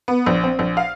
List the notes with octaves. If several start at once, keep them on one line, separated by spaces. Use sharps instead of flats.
B3
A#1
C4
A#1
F5